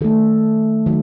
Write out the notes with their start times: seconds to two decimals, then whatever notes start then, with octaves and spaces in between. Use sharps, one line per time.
0.01 D#3 A3 A4
0.86 D#3 F#3